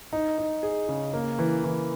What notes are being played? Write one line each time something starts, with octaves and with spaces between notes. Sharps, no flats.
D#4
D#4
G#4
C#3
A#3
E3
E3